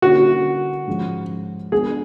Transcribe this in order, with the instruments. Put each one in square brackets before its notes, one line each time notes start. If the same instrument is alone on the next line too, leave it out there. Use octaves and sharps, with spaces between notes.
[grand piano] D3 G3 A#3 C#4 E4 [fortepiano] F#4
[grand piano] G#2 F3 G#3 C#4
[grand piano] G#3 B3 D4 [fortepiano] G#4